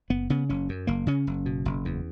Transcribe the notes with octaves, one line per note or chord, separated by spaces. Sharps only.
F#1 B3
C#3 B3
F#1 C#4
F#2
F#1 A#3
C#3 C#4
F#1
B2
F#1
E2